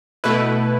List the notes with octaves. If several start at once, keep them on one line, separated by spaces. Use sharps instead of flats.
B2 A3 E4 B4